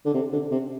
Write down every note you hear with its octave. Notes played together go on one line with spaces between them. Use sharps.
D3
C3
D3
C3